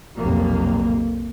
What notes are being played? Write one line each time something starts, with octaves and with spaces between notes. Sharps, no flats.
F1 B1 A#3